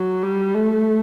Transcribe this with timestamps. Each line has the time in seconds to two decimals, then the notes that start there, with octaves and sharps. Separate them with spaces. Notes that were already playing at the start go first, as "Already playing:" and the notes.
Already playing: F#3
0.23 G3
0.54 A3